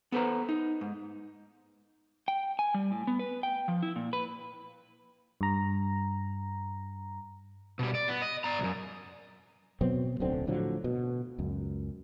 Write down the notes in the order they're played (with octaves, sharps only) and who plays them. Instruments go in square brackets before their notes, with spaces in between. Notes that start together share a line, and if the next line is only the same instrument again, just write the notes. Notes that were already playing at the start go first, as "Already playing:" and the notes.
[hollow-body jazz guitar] B3 A4 B4 C5 A#5
D#4
G#2
[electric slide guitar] G5
G#5
G3
A2
B3
B4
G5
F3
E4
A#2
B4
[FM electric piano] G2 A#5
[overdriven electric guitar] B2 G3
D5
B3
D#5
D5 A#5
B1 F#2
[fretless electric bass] B2 F#3 B3 C4
D1 B1 D3 C4
A2 D3 F3 F#3
B2
C#2 F#2